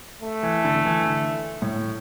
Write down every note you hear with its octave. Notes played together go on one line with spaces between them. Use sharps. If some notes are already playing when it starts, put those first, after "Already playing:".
A3
E3
D3
D3
E3
D3
A2